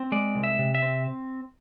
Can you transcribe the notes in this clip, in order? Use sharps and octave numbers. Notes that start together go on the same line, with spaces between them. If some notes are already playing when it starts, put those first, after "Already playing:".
Already playing: C4
G#3 D5
C2
E5
C3
E5
C4